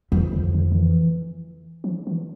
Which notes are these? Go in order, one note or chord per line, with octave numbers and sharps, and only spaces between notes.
F2 E3
D3
D3
D3
E3
F3
E3